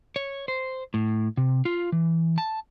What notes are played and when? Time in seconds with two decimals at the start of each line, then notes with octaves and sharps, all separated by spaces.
0.16 C#5
0.48 C5
0.94 A2
1.37 C3
1.65 F4
1.92 E3
2.38 A5